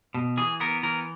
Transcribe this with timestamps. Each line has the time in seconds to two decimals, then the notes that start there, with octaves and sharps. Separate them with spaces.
0.14 B2
0.37 E3 G#4
0.60 B3 A#4
0.83 E3 A#4